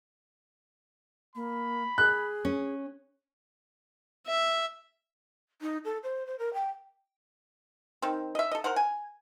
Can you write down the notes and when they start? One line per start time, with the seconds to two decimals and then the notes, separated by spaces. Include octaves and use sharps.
1.36 A#3 B5
1.98 G#4 F#6
2.45 C#4
4.27 E5
5.62 D#4
5.85 A4
6.03 C5
6.27 C5
6.39 A#4
6.54 G5
8.02 D#3 C4
8.35 D#5 E5
8.51 A4 D#5
8.64 A#4 C5 F#5
8.76 G#5